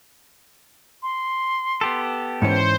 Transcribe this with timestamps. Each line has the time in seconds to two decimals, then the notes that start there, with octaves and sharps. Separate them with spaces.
1.03 C6
1.81 B3 G4 A4
2.42 G#2 E3 C#4 C5 C#7